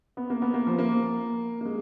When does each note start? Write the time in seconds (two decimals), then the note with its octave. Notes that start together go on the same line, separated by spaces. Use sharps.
0.17 B3
0.30 A#3
0.42 B3
0.54 A#3
0.67 F3
0.78 A#3
1.61 A#3
1.65 G#3